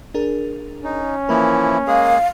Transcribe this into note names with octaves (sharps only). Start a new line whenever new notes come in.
D4 G#4 A#4
C#4 D#4
E3 F3 A#3 E4 A#4
G#3 A#3 G#4 A#4 F5